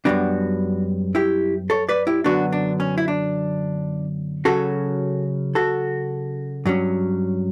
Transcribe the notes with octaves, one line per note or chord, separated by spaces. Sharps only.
F#2 E3 G3 B3 D4 F#4
E4 G4
A4 C#5
B4 D5
E4 G4
F#2 D3 F#3 B3 D4 F#4
D4
C#4
E4
D4
C#3 F#3 C#4 F#4 A4
F#4 A4
G2 F#3 C#4